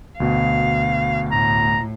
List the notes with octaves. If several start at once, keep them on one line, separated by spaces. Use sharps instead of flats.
D2 B2 F5
A2 A#5